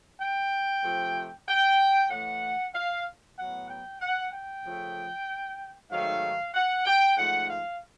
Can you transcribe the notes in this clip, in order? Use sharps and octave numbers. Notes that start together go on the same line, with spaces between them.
G5
C3 F3 A3
G5
A2 E3 A3 F#5
F5
A2 F#3 B3 F#5
G5
F#5
G5
C#3 F3 A3
G#2 D#3 F#3 A3 F5
F#5
G5
G#2 F3 A3 F#5
F5